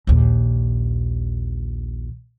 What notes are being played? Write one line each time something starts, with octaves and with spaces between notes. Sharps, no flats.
A#1 D#2